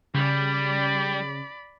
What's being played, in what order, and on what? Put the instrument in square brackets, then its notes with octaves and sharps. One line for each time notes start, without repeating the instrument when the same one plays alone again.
[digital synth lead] C#3 [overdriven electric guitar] G3 [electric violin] D5 B5